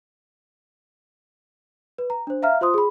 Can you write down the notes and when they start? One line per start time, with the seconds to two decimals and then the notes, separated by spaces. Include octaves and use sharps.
1.98 B4
2.10 A#5
2.27 D4 C5
2.42 E5 F5 A#5 F6
2.61 F4 C5 C6 D#6
2.74 G#4 B5